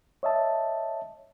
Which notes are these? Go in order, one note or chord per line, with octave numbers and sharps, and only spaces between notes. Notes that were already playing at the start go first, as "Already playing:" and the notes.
C#5 D#5 E5 A5